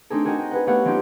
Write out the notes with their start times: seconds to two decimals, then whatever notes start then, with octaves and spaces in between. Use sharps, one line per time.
0.10 A3 C4 D4 D#4 G#4 A4
0.25 F#4 G#4 A#4 D#5 G5
0.39 G5
0.51 G#4 B4 F#5
0.67 A3 B3 G4 C#5 F5 F#5
0.85 F#3 C4 C#4 D#4 F4 G4